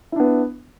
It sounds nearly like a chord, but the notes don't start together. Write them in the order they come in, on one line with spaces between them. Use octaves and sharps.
E4 D4 B3